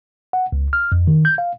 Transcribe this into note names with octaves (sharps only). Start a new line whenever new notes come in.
F#5
C#2
F6
F2
D#3
G6
F5